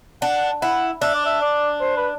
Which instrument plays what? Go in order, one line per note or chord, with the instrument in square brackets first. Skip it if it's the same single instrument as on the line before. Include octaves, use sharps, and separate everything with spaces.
[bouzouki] D4 [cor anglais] F#5
[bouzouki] E4 [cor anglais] F#5
[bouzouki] D4 [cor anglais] E5
[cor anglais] D5
E5
D5
C5
B4